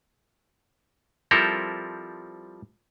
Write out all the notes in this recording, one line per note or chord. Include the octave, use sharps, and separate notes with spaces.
F3 G3 C4 E4 A4 A#4